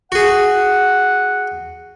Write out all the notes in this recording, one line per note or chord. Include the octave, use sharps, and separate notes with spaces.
F#4 G#4 F#5